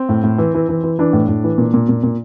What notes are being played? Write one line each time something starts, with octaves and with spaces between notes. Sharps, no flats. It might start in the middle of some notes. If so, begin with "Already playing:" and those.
Already playing: C4
A2
A2
E3
E3
E3
E3
E3 D4
A2
A2
E3
A#2
A#2
A#2
A#2